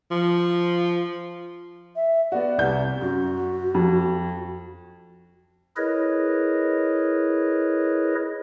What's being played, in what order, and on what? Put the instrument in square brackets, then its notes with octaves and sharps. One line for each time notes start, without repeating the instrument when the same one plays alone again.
[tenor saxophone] F3
[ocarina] E5
[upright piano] B3 F#4 [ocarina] D5
[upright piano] C2 G6
[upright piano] F#2 [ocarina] F#4
[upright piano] F2
[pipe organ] E4 G#4 A#4 B4 C#5 D#5